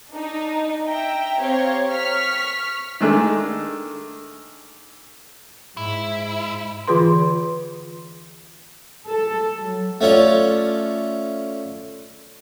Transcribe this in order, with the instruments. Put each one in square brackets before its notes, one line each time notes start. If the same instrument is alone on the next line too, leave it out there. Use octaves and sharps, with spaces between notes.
[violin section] D4 D#4
E5 G5 A#5
C4 G4 C#5 F5 A#5
C#6 F6 B6
[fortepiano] D#3 G#3 A3 D4
[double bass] G#2 [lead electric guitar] E4
[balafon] D3 E3 F4 G#4 B4 C6
[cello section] A4
F#3
[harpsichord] A3 C#4 F4 D5